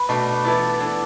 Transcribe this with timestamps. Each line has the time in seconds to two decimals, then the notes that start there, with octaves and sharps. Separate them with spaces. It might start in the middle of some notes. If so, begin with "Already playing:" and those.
Already playing: B4
0.09 B2 A3 D4
0.44 E3 B3 E4 A4 D5
0.80 E3 B3 D4 A4